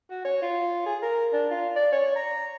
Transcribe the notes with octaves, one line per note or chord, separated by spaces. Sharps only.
F#4
C#5
F4
G#4
A#4
D4
F4
D5
C#5
A#5